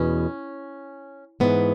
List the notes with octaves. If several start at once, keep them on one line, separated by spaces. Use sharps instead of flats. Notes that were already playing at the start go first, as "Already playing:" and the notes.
Already playing: E2 B2 C#4
G#2 E3 B3